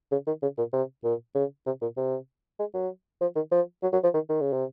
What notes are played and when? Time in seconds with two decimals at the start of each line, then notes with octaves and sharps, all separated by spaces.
0.12 C#3
0.27 D#3
0.42 C#3
0.58 A#2
0.73 C3
1.04 A#2
1.35 C#3
1.66 C3
1.82 A#2
1.97 C3
2.59 G#3
2.74 F#3
3.21 F3
3.36 D#3
3.52 F3
3.82 F#3
3.93 F#3
4.03 F3
4.14 D#3
4.29 D#3
4.41 C#3
4.53 C3